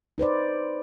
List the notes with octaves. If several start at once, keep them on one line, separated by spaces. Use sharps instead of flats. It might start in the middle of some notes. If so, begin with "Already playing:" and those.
D#4 B4 C5 D5